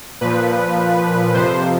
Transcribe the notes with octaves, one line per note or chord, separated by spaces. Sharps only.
A#2 F3 B4
F2 C3 F3 C5